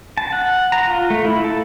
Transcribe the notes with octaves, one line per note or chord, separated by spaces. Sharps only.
A5
F#5
A#5
F4
A3
E4
A4